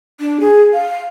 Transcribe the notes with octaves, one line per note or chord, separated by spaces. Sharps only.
D4
G#4
F5